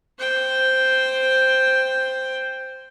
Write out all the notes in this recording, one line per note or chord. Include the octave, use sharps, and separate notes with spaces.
C5 G5